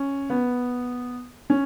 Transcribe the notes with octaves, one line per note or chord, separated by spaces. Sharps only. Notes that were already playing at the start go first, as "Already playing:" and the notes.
Already playing: C#4
B3
C#4